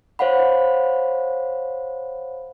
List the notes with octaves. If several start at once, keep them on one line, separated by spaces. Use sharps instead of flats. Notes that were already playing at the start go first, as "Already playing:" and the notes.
C5 C#5 F5 F#5 B5